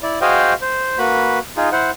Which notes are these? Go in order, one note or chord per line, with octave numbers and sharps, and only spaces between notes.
E4 D5
F#4 G#4 C5 D#5 F5 G5
C5
A#3 F#4 B4 B5
D#4 F4 G#4
E4 C5 F#5